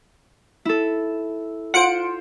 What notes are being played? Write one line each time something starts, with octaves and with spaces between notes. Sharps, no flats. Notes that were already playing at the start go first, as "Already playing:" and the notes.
E4 A4
F4 C5 F#5 C#7 D7